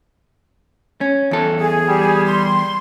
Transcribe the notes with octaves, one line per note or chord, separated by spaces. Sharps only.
C#4
E2 A4
G#4
G3
C6